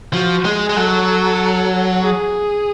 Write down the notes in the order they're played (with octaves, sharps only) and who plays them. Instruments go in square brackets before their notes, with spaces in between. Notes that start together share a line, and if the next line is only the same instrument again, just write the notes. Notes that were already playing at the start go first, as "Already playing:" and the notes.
[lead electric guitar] F3 [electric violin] F#4
[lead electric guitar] G#3 [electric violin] G#4
[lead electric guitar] G#3
[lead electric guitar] F#3 [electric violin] A4
[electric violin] G#4